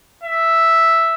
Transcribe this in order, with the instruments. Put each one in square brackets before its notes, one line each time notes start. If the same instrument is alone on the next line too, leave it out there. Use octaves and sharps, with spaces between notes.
[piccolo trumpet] E5